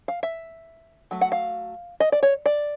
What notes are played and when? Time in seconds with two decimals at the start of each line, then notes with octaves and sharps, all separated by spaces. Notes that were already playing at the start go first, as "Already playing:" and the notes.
0.08 F5
0.23 E5
1.11 F#3 A3
1.21 F#5
1.32 F5
2.00 D#5
2.12 D5
2.23 C#5
2.46 D5